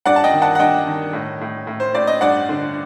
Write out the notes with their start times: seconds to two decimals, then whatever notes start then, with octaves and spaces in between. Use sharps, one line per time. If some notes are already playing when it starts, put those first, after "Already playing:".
0.05 G2 D5 F#5
0.16 A5
0.24 D#5 G5
0.33 D#3
0.42 F#5 A5
0.55 F#5
0.59 G2 D#5 G5
0.87 D#3
1.13 A2
1.41 A2
1.67 A2
1.80 C5
1.95 A2 D5
2.07 D#5
2.21 G2 D5 F#5
2.49 D3